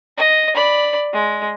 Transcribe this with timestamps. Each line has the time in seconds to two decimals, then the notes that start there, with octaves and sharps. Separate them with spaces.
0.17 D#5
0.55 D5 B5
1.13 G#3